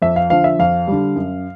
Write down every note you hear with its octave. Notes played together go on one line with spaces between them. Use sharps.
F2 E5
F5
D3 F3 F5
E5
F2 F5
D3 G3
F#2